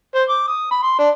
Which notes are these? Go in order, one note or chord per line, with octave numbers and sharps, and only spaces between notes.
C5
D6
D#6
B5
C6
D4